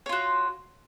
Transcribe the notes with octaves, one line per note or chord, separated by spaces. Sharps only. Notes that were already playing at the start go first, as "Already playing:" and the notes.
F4 F#4 C#5